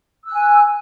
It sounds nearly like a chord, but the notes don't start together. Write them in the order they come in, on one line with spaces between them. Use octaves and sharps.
E6 F#6 G#5